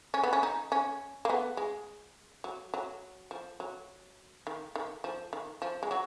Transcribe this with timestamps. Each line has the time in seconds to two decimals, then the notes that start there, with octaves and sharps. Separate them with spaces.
0.14 C#4
0.23 B3
0.33 C#4
0.43 D#4
0.72 C#4
1.25 A#3
1.30 B3
1.57 G#3
2.44 F#3
2.74 F#3
3.31 F3
3.60 F#3
4.47 D#3
4.76 D#3
5.04 F3
5.33 D#3
5.62 F3
5.83 G#3
5.91 F#3